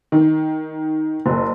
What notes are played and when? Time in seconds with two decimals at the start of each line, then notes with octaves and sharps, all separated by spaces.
0.12 D#3
1.26 F#1